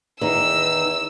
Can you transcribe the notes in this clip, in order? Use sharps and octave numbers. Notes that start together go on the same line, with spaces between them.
E2 D#3 D#4 E6